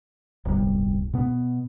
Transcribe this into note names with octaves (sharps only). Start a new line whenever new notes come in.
D1 G1 C2 G3
B2 B3